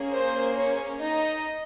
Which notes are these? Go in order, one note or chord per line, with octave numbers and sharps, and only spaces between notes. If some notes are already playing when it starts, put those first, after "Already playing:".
Already playing: A#3 C#4 G#4
C5
C#4 C#5
D#4 D#5